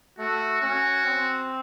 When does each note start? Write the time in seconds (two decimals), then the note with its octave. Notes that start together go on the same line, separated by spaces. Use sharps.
0.18 A3 F#4
0.61 C#4 F#4
1.05 C4